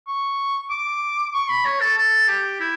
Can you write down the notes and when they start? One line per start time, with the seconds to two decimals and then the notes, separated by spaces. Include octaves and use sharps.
0.07 C#6
0.70 D6
1.34 C#6
1.49 B5
1.66 C#5
1.80 A4
1.97 A4
2.28 G4
2.60 E4